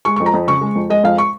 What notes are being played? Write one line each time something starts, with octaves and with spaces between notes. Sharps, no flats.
G#3 C#6
C#6
F2
A#5
F2
C#3 C#6
G#3
F2
G#3 D#5
F2 F5
C#6